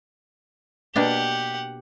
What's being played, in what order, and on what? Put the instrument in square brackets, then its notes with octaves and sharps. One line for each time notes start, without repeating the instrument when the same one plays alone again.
[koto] B2 A#3 D4 [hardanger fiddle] G4 F#5